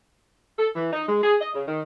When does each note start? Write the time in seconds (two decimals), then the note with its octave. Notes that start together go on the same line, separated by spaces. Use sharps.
0.59 A4
0.76 E3
0.93 D#4
1.09 G#3
1.23 G#4
1.41 D#5
1.55 C#3
1.68 D#3